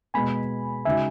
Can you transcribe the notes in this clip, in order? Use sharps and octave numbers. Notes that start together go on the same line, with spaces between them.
B2 G#3 B3 G#5 B5
C#3 G#3 D#4 F#4 E5 G#5